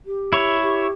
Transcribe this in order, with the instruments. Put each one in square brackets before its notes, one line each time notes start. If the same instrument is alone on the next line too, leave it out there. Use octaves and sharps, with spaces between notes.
[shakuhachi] G4
[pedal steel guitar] E4 C#5
[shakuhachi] G4